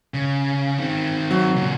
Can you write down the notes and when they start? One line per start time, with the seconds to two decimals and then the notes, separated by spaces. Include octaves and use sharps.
0.14 C#3
0.79 D#3 C4
1.31 F#3
1.56 C#2 A#2